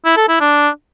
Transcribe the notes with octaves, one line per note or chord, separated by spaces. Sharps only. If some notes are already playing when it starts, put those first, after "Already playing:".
E4
A4
E4
D4